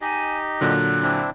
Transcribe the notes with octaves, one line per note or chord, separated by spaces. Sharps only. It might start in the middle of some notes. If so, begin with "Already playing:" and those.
D#4 G4 D#5 G#5
A#2 D3 F#3 F#6
C4 D4 E4